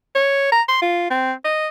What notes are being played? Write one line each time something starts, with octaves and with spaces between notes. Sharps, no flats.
C#5
A#5
C6
F4
C4
D#5